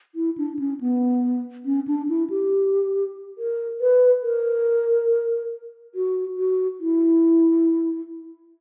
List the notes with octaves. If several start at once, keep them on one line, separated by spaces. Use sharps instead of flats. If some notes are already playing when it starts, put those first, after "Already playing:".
E4
D4
C#4
B3
C#4
D4
E4
G4
A#4
B4
A#4
F#4
F#4
E4